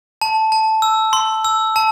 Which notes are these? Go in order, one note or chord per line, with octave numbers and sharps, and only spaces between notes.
A5
A5
E6
C6
E6
A5